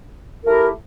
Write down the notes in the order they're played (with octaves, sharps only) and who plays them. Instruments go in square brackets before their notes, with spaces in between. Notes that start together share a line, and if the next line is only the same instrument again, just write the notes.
[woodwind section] A3 E4 G4 A#4